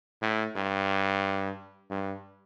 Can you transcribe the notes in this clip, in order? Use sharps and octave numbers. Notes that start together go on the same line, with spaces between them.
A2
G2
G2